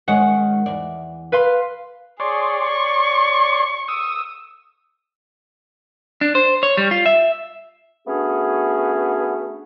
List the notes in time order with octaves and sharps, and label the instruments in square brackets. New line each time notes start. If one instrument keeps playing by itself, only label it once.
[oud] D#3 G#3 C#4 [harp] F#5
[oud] E2 D5
[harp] B4 F5 C6
[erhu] G#4 [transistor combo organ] C#5 D5 C6
[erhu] C#6
[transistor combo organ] D#6 E6
[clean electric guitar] D4
C5
C#5
G3
F4
E5
[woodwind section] A3 B3 C#4 D4 F#4 G#4